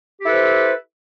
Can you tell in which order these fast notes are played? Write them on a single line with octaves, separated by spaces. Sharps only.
G4 E4 A4 B4 C5